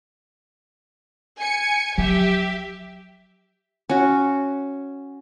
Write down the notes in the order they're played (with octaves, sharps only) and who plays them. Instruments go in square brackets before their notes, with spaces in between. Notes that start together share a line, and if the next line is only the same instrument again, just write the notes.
[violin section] G#5 C#7
[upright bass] F3 F#3 [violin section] G4 E5
[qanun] C#4 F#4